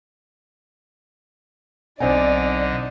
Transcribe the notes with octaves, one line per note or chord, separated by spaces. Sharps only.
B1 B2 D3 C4 D#4 D5 F#5 G#5